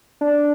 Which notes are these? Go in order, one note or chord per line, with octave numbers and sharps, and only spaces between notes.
D4